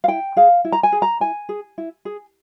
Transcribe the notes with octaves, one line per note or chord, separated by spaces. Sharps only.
F5
E4 G5
G#4 F5
E4
A#5
G#5
G#4
A#5
E4 G#5
G#4
E4
G#4